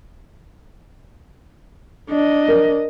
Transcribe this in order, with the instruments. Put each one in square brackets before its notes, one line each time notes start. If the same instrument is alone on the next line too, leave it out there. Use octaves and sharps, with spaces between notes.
[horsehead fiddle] D4 D#5
[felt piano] A#4